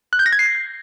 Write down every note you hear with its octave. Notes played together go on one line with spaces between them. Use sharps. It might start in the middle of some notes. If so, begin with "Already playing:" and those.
F#6
G6
A#6
G#6
C7